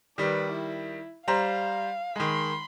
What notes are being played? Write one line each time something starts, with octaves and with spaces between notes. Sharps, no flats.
D#3 G3 B4 D5
E4
G3 C5 F5 A#5
D#3 G#3 B5 C6